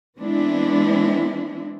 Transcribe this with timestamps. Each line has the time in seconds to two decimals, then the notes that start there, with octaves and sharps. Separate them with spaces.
0.18 E3 G#3 B3 C4 D4 E4